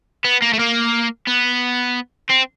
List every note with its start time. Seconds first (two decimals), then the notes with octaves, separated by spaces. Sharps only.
0.24 B3
0.42 A#3
0.53 A3
0.59 A#3
1.27 B3
2.30 C4